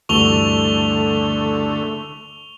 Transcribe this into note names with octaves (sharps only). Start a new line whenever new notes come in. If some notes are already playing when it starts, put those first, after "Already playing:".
D2 G2 D3 E3 A3 C#6 F7 G7